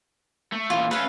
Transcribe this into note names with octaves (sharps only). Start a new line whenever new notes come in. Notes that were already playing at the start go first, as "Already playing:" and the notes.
A3
A#2 E3 F4
A3 C#4 B4 F5